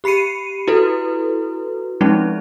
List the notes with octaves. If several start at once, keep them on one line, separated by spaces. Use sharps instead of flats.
G4 B5 C7 C#7 D#7
E4 F#4 A4 B4
F3 G#3 C4 C#4 D#4